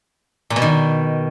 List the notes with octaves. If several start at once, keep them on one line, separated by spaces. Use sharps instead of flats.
A#2
B2
D#3